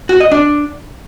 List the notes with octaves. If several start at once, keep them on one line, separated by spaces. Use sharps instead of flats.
F#4
D#5
D4